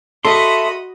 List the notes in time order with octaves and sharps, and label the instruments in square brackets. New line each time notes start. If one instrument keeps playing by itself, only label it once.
[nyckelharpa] F#4 B5 [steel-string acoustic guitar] A4 E5 A5 [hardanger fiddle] D#5 [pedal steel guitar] C6